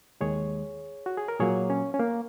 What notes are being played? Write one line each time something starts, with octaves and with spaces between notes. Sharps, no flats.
D#2 D#3 G#3 G#4 C#5
F#4
G#4
A#4
A#2 F#3 A#3 G#4 C#5
C#4
C#4
A#3